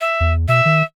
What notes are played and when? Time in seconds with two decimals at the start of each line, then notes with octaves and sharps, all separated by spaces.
0.01 E5
0.20 E2
0.48 B2 E5
0.65 D#3